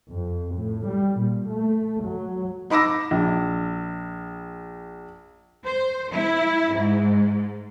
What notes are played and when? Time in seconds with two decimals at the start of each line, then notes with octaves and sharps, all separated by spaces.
0.12 F2
0.55 A2
0.87 G3
1.19 A#2
1.50 A3
2.06 F#3
2.70 D#4 B5 D6 E6 A#6
3.11 A#1
5.65 C5
6.11 E4
6.72 G#2